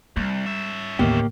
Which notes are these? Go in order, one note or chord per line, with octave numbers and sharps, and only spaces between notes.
C2 G3
C#4 E5
A1 D#2 D3 A#3 B3 G4